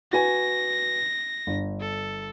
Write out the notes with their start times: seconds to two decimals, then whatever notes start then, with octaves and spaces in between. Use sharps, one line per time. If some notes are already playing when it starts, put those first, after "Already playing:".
0.13 F#4 B4 G#5 A#6
1.47 G1
1.80 A4